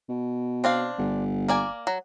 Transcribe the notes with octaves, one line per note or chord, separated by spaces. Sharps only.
B2
C4 D4 F5
G1
A#3 D5 G#5
F#3